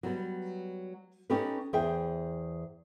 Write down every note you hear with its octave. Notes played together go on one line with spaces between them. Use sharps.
F#3 G3 B3
C#4 D#4 G4 A4 B4
E2 G#4 C5 E5 G5